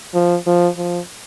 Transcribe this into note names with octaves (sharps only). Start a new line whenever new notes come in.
F3
F3
F3